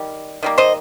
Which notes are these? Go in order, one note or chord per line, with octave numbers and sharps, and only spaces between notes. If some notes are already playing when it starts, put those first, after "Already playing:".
Already playing: D#3 G3
D#3 G3 A#3
C5 D#5